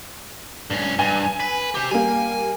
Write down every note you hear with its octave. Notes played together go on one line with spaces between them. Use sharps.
G2 C#4
G2 G#5
B4
G4 C5
G3 A#3 G#5